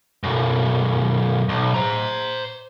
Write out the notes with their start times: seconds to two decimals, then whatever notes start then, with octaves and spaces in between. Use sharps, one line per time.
0.23 B1 F#2
1.49 B1
1.74 C5 A#5